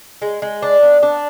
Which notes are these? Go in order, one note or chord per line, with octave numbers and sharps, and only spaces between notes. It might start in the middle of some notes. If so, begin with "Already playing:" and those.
G#3
G#3
D4
B3
D4